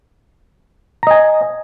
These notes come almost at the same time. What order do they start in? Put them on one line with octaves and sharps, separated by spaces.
A#5 D#5 G#5